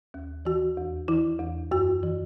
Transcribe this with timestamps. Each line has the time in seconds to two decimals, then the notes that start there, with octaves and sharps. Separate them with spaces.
0.14 D#2
0.45 E3 F#4
0.77 E2
1.08 E3 E4
1.40 E2
1.71 F#2 F#4
2.03 E3